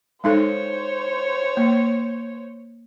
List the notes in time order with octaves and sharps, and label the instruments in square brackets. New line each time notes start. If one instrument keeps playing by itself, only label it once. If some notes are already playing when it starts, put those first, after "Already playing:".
[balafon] G#3 D#4 A4 [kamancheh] C5 C#5
[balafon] A#3